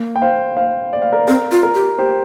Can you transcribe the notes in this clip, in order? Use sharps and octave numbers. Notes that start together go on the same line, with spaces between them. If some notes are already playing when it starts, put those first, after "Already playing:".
Already playing: A#3
G5
C5 F5
C5 F5
D5
F5
A#4 D5
C4 A#4
F4
A#4
G4
G4 C5